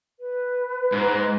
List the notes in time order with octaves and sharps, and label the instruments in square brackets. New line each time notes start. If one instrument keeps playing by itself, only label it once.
[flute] B4
[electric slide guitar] G#2